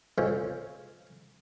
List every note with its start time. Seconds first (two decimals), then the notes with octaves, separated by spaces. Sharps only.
0.18 D3 G#3 C#4 F4 C5 C#5